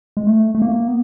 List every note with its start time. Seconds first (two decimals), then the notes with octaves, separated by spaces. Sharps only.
0.17 G#3
0.27 A3
0.55 A3
0.62 A#3
0.87 B3